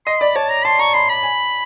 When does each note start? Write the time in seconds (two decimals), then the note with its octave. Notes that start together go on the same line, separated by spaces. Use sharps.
0.06 D#5 C6
0.21 D5 B5
0.36 C#5 A5
0.50 A#5
0.65 A5 C6
0.79 A#5 C#6
0.94 B5 C6
1.09 B5
1.23 G#5